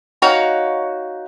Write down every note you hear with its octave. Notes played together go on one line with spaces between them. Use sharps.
D#4 F#4 C#5 F5